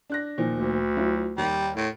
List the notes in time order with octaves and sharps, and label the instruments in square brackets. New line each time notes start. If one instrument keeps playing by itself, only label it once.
[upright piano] D4 F#6 A#6
A#2 D#3 F3
[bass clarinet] D2
[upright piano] F#3 E4 F4
[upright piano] D#2 [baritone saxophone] G3
[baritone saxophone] A2